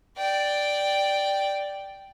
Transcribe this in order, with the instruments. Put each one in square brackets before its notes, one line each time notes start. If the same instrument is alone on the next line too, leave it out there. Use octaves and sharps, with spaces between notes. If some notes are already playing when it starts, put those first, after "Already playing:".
[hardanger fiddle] D5 G5